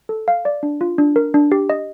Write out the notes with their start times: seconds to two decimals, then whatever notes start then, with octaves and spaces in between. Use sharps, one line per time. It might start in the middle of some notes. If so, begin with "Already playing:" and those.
0.09 A4
0.28 F5
0.45 D5
0.63 D4
0.81 F4
0.98 D4
1.16 A#4
1.34 D4
1.52 G4
1.70 D#5